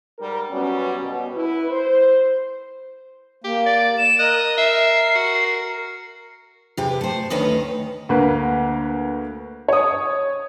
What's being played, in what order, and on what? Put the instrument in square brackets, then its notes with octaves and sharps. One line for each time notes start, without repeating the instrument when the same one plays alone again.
[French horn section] G#2 G3 A#4
F#2 G3 B3 C#4 F#4
B2
E4 B4
C5
[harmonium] A#3 [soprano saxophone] G4
[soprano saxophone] D5 [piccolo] A6
[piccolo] E7
[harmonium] A#4 [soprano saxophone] D#5 [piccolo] F#6
[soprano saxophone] E5 [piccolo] C7
[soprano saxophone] F#4
[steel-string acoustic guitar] E2 C3 G4 B4
A3 C5
D2 D#3 C#4 B4 D#5
[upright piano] D2 A#3 B4
C#5 D#6